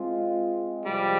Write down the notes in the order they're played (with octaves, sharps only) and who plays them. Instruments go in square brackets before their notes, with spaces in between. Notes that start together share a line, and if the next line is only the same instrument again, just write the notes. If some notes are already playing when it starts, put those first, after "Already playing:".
Already playing: [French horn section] G#3 C4 F4
[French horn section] C3 F3 G#3 [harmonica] G3